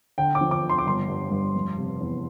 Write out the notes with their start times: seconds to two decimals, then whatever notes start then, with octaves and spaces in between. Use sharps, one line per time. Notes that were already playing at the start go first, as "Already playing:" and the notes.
0.18 D3 G5
0.35 D6
0.41 F3
0.51 D6
0.63 D3
0.69 C6
0.78 D6
0.86 G1 C6
1.08 G2
1.31 G2
1.55 F1
1.78 C3
2.00 E2